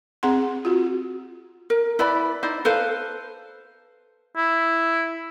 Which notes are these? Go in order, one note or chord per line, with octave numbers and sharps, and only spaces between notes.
C4 G#4 F#5 C6
F4 F#4
A#4
E4 B4 D5 B5
D#4 E4 C5 D5
A4 B4 C5 F5
E4